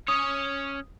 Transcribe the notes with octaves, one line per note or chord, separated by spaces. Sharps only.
C#4 C#5 D#6